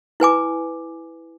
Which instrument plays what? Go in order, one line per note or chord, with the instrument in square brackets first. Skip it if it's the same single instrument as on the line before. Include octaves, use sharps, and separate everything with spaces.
[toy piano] E4 B4 G#5 D6